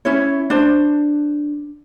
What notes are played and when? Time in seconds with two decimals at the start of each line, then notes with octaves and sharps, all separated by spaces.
0.05 C#4 E4 C#5
0.50 D4 C5